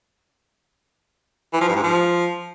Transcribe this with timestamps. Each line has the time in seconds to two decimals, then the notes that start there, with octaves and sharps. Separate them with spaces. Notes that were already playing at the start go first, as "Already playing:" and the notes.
1.53 E3
1.61 F3
1.69 G2
1.76 G#2
1.84 F3